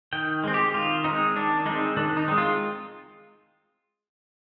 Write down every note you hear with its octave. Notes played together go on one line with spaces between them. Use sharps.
D#3 G5
G#3 C4
G4
D#3 F4
G#3 C4 D#4
D#3 D4
G#3 C4 D#4
D#3 D4
D#4
G#3 C4
F4